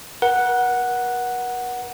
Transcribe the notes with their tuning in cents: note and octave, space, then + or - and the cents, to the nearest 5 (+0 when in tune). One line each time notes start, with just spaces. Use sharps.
A#4 +45 F#5 +0